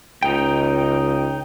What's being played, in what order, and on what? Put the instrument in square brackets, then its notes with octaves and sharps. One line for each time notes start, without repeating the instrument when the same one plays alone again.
[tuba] C#2 [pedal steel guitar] D#4 G5